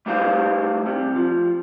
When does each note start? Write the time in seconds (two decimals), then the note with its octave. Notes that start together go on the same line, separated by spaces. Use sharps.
0.06 G3 A3 D#4 G4 C5 F5
0.86 C3 G3
1.16 F3